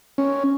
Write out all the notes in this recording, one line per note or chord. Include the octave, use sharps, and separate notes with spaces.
C#4